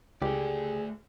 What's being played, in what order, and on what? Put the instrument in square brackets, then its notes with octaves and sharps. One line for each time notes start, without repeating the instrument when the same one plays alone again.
[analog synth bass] C#2 [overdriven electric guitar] A3 D5 [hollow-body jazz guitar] G4 [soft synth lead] G#4